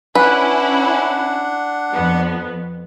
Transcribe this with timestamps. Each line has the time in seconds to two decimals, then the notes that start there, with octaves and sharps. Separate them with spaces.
0.15 C#4 D4 E4 B4 F#5
1.93 F2 B3